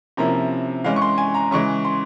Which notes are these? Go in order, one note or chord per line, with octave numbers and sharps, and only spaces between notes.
C3 F3 A#3 C#4 E4 A#5
E3 G#3 C#4 F5
C#6
C6
G#5
A#5
C#3 E3 G#3 C#6
C6